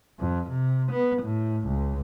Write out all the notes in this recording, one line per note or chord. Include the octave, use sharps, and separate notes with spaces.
F2
C3
B3
A2
C#2